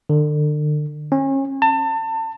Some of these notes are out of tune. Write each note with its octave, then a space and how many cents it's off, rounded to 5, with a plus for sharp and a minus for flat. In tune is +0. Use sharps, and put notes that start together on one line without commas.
D3 +35
C#4 -35
A5 +30